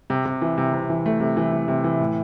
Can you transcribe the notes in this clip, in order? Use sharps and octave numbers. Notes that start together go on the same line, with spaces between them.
C3
C3
E3
C3
C3
E3
A3
C3
E3
E3
C3
E3
A2